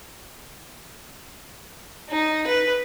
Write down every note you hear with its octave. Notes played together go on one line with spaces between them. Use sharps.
D#4
B4